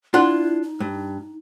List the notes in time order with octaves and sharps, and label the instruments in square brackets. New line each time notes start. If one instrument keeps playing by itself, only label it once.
[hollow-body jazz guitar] D4 F4 F#5 [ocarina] E4
[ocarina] D#4
[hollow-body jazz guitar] G2